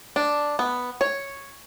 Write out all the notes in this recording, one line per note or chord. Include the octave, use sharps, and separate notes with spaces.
D4
B3
C#5